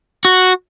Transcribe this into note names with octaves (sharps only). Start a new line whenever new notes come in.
F#4